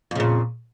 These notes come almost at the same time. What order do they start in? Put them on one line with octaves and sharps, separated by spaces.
F2 C#3 A#2